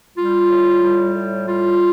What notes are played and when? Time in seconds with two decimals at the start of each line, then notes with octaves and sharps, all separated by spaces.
0.17 G3 F4
0.49 A2
0.83 G3
1.15 A2
1.48 G3 F4